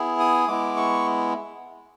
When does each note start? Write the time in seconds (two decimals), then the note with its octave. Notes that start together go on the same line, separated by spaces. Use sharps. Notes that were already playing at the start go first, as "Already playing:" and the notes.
Already playing: B3 E4 G#4
0.19 D#6
0.48 G#3 B3 E4 D6
0.76 C#6